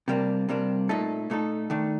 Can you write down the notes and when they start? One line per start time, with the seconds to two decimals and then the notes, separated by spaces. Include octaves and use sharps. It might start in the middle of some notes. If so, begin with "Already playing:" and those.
0.08 C3 G3 A#3 D4
0.49 C3 G3 A#3 D4
0.89 A#2 A3 D#4 A4
1.30 A#2 A3 D#4 A4
1.70 D#3 A3 D4